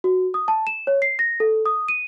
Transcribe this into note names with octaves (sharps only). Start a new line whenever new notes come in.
F#4
D#6
A5
E7
C#5
C7
A#6
A4
D#6
D#7